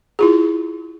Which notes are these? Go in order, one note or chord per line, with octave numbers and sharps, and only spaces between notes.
E4 F4 G#4